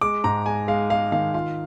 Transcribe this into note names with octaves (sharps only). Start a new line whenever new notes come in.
G#3 D6
G#2 A#5
G#3 G#5
G#3 F5
G#3 F5
D#3 F5
F4 F5